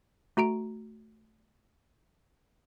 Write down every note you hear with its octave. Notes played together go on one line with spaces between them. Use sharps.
A3 F#4 A#5 D7